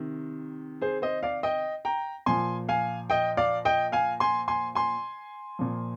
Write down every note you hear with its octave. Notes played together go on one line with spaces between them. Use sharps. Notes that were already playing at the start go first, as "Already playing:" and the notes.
Already playing: C3 D#3
G#4 C5
C5 D#5
D5 F5
D#5 G5
G5 A#5
A#2 F3 G#5 C6
F5 G#5
D#5 G5
D5 F5
D#5 G5
F5 G#5
G#5 C6
G#5 C6
G#5 C6
A#2 F3